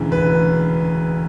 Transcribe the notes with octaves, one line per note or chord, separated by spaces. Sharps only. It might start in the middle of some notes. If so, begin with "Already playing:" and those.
Already playing: E1 D2 C#3 E3
E1 B4